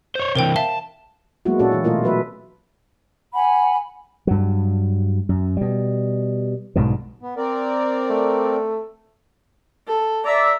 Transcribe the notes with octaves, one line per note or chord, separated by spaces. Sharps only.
C5 C#5
C3 E3 A#4 C5 G5
E5 F5 A5 G7
F#3 G#3 A#3 B3 E4 F#4
A#2 C#4 D4 F#4 A4 D5
E3 E4
B2 A3 E4 F4 A#4 D#5
F#3 B4 E5
F#5 G#5 B5
G2 F#3
F#2
B2 G3
B1 G#2 B2 D3
B3
C4 A#4 D5
A3
A4
D5 E5 A#5